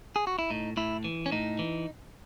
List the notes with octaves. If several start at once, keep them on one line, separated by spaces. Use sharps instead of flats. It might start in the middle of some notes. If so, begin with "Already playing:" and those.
G#4
F#4
E4
A2 D#4
A2 E4
E3
C#4
A2 D#4
E3